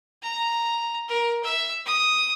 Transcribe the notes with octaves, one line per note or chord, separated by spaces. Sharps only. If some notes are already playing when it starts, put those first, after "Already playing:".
A#5
A#4
E5
D#6